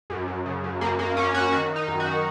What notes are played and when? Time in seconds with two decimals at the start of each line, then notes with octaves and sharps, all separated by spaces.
0.10 F#2
0.28 F#2
0.46 C#3
0.64 F#2
0.81 F#2 A#3
0.99 F#2 A#3
1.17 F#2 C#4
1.34 F#2 F#4
1.52 D#3 F#4
1.70 D#3
1.76 D#4
1.88 F#2
2.00 F#4
2.06 D#3